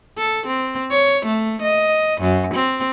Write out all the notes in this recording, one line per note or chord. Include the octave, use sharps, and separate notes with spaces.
A4
C4
C#5
A3
D#5
F#2
C4